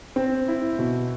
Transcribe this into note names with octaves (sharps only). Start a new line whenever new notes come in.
C4
E4
B2